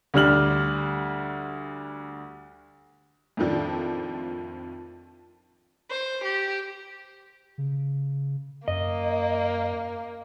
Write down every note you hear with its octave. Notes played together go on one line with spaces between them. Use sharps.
D2 D3 G3 F6 F#7
F2 A2 D#3 F3 D4
C5
G4
C#3
F#2 A#3 D#5